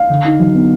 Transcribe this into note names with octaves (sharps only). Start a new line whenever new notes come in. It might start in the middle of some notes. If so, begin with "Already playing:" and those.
Already playing: F5
D3
D#4
F#3
B3